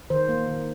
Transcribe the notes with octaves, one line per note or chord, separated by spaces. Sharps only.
D#3 C5
A#3
D#3